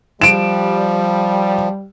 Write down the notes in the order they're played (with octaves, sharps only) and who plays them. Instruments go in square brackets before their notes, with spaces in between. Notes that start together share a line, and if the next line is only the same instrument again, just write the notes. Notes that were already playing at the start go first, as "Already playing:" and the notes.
[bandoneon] F3 [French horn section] G3 [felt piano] D7 E7